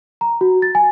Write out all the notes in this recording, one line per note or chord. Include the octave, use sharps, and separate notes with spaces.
A#5
F#4
A6
G#5